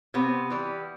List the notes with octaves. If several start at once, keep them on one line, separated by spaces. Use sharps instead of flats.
C3 B3
E3 G3